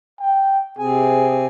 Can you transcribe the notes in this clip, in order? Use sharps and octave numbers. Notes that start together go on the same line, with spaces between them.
G5
C3 C4 G#4 G#5